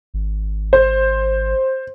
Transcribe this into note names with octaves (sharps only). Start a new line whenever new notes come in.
G#1
C5